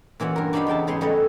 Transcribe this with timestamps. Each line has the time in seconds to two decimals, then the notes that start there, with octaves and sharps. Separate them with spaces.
0.20 A#2 E3 C#4 F#4
0.36 G2 A#4
0.53 D4 D#4 F#4 G4 F5 B5
0.67 E2 C#3 G5 A5
0.87 G#2 C#3 B3 G#5 C6
1.01 G3 A3 C#4 C#5 D#5